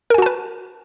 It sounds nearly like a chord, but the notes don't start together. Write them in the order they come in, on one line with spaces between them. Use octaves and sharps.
A#4 G#5 F#4 A5 B4